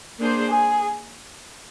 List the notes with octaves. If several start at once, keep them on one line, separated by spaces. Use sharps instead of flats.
A#3 D4 G#4 C5
G#4